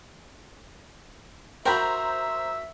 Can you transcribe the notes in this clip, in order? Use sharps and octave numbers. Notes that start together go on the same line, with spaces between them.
F#4 A#4 C5 E5 G5 A#5 B5